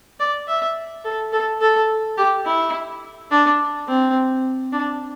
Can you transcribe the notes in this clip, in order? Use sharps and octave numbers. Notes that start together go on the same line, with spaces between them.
D5
E5
A4
A4
A4
G4
E4
D4
C4
D4